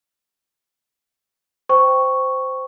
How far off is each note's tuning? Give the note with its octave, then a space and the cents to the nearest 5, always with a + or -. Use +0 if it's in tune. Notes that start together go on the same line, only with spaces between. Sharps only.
C5 -15 G5 +0 C#6 +0